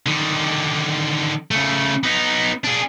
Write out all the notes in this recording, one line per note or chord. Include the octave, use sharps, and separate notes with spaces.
D3 D#3
C#3 A3
B3 D#4
D4 G#4